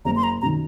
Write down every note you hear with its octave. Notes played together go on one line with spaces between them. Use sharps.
F#1 A#5
C6
A#5
F#2 D#3 A#5